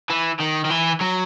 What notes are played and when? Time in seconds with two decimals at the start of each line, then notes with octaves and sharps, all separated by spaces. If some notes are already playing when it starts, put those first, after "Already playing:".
0.10 E3
0.40 D#3
0.65 D#3
0.70 E3
1.01 F#3